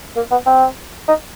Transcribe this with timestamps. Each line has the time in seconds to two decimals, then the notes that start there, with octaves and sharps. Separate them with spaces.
0.16 A#3
0.31 B3
0.46 C4
1.08 D#4